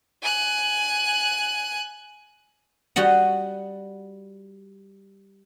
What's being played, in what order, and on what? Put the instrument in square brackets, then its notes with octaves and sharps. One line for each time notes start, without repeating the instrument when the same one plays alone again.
[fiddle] G#5 F#6
[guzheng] G3 F#4 D#5 F#5